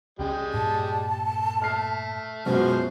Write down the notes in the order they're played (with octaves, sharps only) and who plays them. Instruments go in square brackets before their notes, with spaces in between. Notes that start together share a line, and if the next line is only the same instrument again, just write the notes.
[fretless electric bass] C#2 C#4 [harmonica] G3 G#3 [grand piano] G5
[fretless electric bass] G2 A#2 [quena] A5
[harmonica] A3 [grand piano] F6 C7
[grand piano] F#2 B2 G#3 [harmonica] F3 F#4 F6 [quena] C5